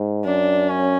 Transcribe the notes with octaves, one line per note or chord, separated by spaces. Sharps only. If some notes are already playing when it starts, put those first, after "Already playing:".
Already playing: G#2
F#2 D4
C#4